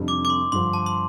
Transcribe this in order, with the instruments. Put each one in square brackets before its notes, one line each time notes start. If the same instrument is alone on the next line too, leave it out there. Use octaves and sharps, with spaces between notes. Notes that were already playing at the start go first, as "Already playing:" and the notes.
Already playing: [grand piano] F1 F2 C3 G3 D4
[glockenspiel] D6
D6
C6
[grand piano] G2 D3 F3 [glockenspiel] C6
[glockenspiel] A5
C6